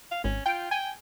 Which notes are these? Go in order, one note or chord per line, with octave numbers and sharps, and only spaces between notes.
F5
G#1 C#4
F4 G5
G5 G#5